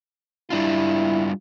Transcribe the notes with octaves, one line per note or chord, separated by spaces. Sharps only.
G3 D4 E4 F4